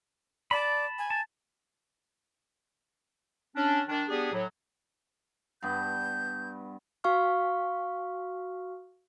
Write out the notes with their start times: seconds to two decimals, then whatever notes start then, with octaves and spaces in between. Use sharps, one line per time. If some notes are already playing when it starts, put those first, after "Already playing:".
0.51 D5 A5 B5
0.99 G#5
1.10 A5
3.57 C#4 D4
3.88 D#3 D4
4.08 G3 B3 D4 G4 G#4
4.33 A2 F#3
5.63 G2 G3 B3 G6
7.04 F#4 F5 C#6 F6